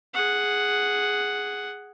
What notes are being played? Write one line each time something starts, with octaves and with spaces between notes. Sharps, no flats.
G#4 F#5